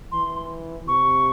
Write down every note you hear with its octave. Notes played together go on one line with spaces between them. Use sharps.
E3 C6
C3 C#6